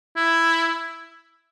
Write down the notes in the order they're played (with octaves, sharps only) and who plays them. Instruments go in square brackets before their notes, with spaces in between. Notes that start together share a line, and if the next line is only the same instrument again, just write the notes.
[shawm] E4